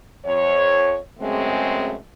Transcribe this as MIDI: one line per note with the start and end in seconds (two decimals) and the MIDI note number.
0.25 0.97 41
0.25 0.97 73
1.19 1.95 42
1.19 1.95 49
1.19 1.95 56
1.19 1.95 57
1.19 1.95 60